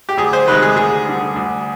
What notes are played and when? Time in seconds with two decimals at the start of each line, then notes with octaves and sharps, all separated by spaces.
0.09 G4
0.17 D2 G#4
0.33 C5
0.47 C3 D#3 G#3 B4
0.62 G#4
0.76 D2 G#4
1.06 D3 G3
1.36 D2